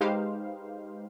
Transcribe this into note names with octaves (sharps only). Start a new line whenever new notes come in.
G#3 D#4 G4 B4 C5 F5